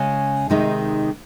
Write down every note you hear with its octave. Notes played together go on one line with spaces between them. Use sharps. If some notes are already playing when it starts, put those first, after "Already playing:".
Already playing: C#3 G#3 C#4
C3 D#3 G#3 D#4